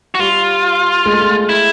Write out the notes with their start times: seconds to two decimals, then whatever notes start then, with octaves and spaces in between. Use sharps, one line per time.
0.15 F#4
0.19 G3 F4
1.06 G#3
1.13 A3
1.21 G#3
1.49 E4